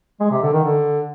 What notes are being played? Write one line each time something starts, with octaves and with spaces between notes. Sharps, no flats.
G#3
C3
D3
D#3
D3